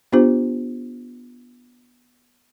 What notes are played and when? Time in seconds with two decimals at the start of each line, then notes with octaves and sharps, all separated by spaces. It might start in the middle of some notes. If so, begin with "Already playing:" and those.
0.12 B3 D4 F4 G4 C5